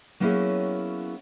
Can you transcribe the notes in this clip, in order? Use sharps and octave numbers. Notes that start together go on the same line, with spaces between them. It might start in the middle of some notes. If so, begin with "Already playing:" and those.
F#3 A#3 B3 C#4 E4 G#4